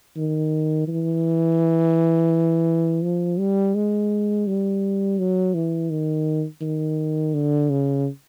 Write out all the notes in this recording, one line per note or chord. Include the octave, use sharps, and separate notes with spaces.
D#3
E3
F3
G3
G#3
G3
F#3
E3
D#3
D#3
D3
C#3